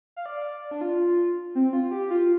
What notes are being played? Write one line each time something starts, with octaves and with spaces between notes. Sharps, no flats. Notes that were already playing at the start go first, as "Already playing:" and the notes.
F5
D5
D4
F4
C4
F4
G4
F4